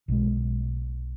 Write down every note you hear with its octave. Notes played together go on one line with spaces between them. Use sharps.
B1 B2 G#3